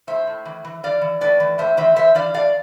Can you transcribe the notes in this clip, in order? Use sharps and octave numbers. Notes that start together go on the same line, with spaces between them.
A2 C5 E5
A2
E3
E3
E3 D5 F5
E3
A2 B4 D5
E3
A2 C5 E5
E3 C5 E5
E3 C5 E5
E3 D5 F5
A2 D5 F5